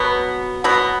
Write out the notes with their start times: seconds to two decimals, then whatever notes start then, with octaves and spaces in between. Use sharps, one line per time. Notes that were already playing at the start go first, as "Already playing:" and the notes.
Already playing: B2 F#3 B3
0.64 B2 F#3 B3